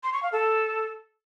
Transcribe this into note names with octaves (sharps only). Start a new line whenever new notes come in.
C6
C#6
F5
A4